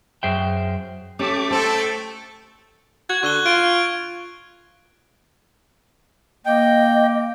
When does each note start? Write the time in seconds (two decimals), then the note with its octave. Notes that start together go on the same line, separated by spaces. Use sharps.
0.23 F#2 G#4 C5 E5 G5
1.19 A3 C#4 G4 D6
1.51 A4 C5 G5
3.09 F#4 G#6
3.23 D3 C#6 F#6 G7
3.46 F4 D7
6.46 A#3 D#5 G5